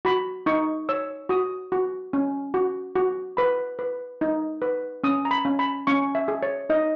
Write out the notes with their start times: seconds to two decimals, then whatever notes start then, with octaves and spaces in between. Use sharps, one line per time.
0.05 F#4 B5
0.46 D#4 C#6
0.89 C#5 E6
1.29 F#4 D#6
1.72 F#4
2.13 C#4
2.54 F#4
2.96 F#4
3.37 B4 B5
3.79 B4
4.21 D#4
4.62 B4
5.04 C#4 D#6
5.25 A#5
5.31 B5
5.45 C#4
5.59 B5
5.87 C#4 C#6
6.15 E5
6.28 G#4
6.43 C#5
6.70 D#4 D#5